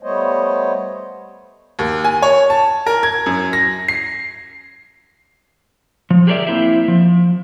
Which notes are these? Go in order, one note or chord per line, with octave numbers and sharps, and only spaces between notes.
G3 A3 B3 C5 C#5 D#5
D#2
G#5
C#5
A5
A#4
G#6
F#2
A#6
C7
F3
G4 G#4 A#4 B4 D5 E5
A#3 C4 E4 C5 E5
F3